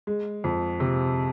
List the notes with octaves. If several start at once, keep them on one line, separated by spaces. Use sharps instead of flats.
G#3
F2
C3